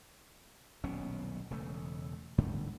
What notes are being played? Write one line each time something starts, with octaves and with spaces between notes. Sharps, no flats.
D#1 B1 B2 C#4
E1 C#3 A3
G#2 D3 G3 A3